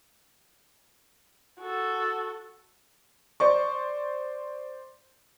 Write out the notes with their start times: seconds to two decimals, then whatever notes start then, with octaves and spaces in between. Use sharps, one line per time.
1.61 F#4 A4
3.40 C5 D5 C#6